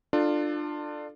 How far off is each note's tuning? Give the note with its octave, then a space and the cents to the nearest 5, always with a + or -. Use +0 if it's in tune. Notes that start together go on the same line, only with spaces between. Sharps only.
D4 +25 F4 +0 A4 +0